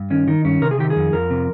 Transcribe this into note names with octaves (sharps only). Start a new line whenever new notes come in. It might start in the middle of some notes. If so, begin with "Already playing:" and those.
Already playing: G2
D#3 C#4
D#3 D#4
G2 C#4
C3 A#4
G#4
D#3 G4
G#4
F2
F2 A#4
C3